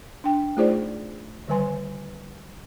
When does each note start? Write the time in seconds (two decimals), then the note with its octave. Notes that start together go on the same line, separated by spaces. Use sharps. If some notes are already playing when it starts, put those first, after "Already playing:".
0.24 D4 G5
0.57 A3 D#4 F4 G#4 C5 D5
1.48 D3 D#3 G3 B4 G#5 C6